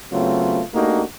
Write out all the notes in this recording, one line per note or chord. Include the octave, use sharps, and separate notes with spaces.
C#3 F#3 A3 B3 C4 F4
A3 A#3 D4 D#4 F#4 G4